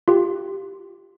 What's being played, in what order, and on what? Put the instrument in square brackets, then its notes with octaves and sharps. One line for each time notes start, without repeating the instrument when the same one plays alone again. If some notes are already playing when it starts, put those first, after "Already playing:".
[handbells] F4 G4